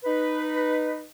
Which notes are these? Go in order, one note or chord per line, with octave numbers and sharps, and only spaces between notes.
D#4 B4